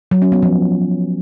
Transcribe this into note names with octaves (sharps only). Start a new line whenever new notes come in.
F#3
C#4
B3
F3